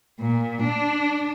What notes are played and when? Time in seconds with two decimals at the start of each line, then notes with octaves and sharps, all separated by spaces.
0.20 A#2
0.63 D4